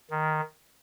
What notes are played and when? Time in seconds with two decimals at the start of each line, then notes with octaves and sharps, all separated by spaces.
0.10 D#3